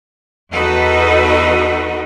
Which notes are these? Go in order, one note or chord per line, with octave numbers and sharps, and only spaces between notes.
E2 D#4 F#4 A4 B4 D#5